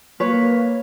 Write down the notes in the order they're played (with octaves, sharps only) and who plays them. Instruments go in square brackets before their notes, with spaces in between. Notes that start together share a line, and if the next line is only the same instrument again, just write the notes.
[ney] A#3 [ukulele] B4 C#5